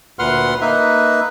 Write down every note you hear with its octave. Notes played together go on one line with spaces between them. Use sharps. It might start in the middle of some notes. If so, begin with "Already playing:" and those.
D2 A#2 B4 F#5 C6 F6
A#3 D#4 B4 E5